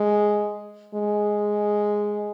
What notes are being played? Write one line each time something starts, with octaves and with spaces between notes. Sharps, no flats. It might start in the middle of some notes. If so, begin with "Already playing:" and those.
Already playing: G#3
G#3